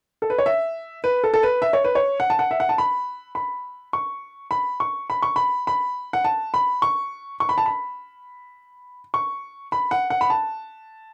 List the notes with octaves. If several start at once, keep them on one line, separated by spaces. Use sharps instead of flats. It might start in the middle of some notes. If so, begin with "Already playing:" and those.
A4
B4
C#5
E5
B4
A4
A4
B4
E5
C#5
B4
C#5
F#5
A5
F#5
E5
F#5
A5
B5
B5
C#6
B5
C#6
B5
C#6
B5
B5
F#5
A5
B5
C#6
C#6
B5
A5
B5
C#6
B5
F#5
F#5
B5
A5